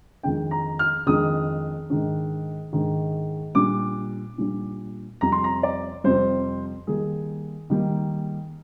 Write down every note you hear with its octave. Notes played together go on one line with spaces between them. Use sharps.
F2 D#3 G#3 D4 G5
A#5
F6
F2 D#3 G#3 D4 D#6
G#2 D#3 G#3 D4
G#2 D#3 G#3 D4
A#2 G3 D4 D6
A#2 G3 D4
F2 C3 G3 A#5
C6
A#5
D5
F2 C3 G3 C5
D#3 G3 A#3 G#4
D#3 G3 A#3